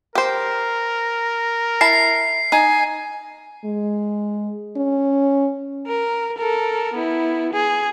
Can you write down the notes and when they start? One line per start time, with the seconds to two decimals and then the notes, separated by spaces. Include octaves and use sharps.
0.15 G4 A#4 C5
1.81 E4 A5 C7
2.52 D#4 G#5
3.65 G#3
4.77 C#4
5.87 A#4
6.38 A4 A#4
6.94 B3 E4
7.53 G#4